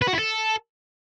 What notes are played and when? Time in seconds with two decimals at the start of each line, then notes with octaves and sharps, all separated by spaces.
0.02 B4
0.07 F#4
0.13 E4
0.19 A4